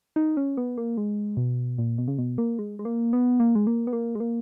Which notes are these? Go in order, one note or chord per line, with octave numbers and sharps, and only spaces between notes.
D#4
C#4
B3
A#3
G#3
B2
A#2
B2
C#3
B2
A#3
G#3
G#3
A#3
B3
A#3
G#3
A#3
B3
A#3
G#3
A#3